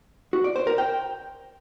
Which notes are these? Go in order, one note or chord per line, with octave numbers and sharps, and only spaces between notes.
F#4
D5
C5
A#4
G5